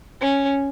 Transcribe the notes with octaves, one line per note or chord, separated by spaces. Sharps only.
C#4